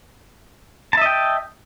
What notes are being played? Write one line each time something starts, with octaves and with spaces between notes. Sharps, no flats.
D#5 E5 G5 A5